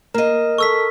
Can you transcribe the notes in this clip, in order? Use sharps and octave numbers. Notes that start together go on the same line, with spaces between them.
A#3 A#4 D#5
A4 C#6 E6 B6